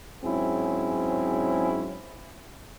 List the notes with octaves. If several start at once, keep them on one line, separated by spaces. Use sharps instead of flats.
G#2 F#3 C4 C#4 E4 G#4